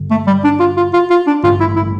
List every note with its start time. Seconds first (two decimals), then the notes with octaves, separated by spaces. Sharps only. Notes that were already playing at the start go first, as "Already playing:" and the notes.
Already playing: G2 D3
0.11 A3
0.27 G3
0.44 D4
0.60 F4
0.77 F4
0.93 F4
1.10 F4
1.27 D4
1.43 A1 G2 D3 A3 F4
1.60 E4
1.76 E4